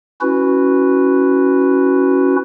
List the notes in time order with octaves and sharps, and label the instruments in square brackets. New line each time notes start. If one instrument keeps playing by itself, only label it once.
[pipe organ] C#4 E4 F#4 B4